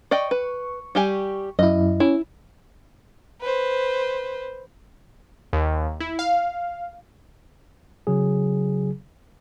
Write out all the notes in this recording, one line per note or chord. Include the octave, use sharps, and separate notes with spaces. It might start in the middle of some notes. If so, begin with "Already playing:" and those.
D5 D#5 G5 C#6
B4
G3 G4 G#5
F#2 E4 D#5
C#4 E4
B4 C5
D#2
E4
F5
C#3 F#3 G#4